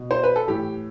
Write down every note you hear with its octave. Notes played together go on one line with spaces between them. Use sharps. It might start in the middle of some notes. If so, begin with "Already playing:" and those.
Already playing: B2
C5
B4
A4
A2 E3 G4